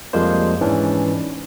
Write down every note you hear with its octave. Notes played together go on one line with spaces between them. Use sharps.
F2 F3 G3 G#3 A#3 C5
G#2 E3 C#4 D4